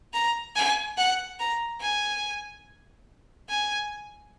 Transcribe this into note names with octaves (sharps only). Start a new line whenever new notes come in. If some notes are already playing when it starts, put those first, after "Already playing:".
A#5
G#5
F#5
A#5
G#5
G#5